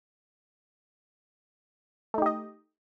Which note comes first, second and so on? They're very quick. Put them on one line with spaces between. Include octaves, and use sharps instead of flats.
A3 D#4 G4 D#5